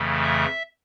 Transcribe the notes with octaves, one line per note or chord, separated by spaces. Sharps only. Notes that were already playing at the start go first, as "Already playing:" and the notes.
Already playing: F2 C#3 E3 A3
E5